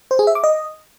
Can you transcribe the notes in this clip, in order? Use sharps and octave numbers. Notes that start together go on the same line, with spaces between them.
C5
G#4
E5
D6
D#5